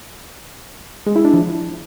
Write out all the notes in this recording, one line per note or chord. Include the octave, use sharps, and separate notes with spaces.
G#3
E4
D4
F3